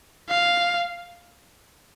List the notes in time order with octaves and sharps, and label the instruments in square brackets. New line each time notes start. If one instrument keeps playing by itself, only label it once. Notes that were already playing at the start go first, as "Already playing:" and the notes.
[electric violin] F5